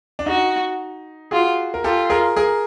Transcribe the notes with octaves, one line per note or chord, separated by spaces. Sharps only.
D4
D#4 F#4
F4 F#4 G#4
A#4
F4 G4 A4
G#4 A#4
G#4 A#4